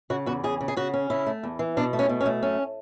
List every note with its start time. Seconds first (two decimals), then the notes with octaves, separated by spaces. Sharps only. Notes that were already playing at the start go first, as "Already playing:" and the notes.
0.10 C#3 F#4
0.26 E2 F#4
0.44 C#3 G#4
0.61 C#3
0.68 G#4
0.77 C#3 F#4
0.94 C#4
1.10 C#3 E4
1.27 A3
1.43 E2
1.59 E3
1.77 B2 D4
1.93 A3
1.99 C#4
2.09 B2
2.21 C#4
2.26 A3
2.43 F#2 C#4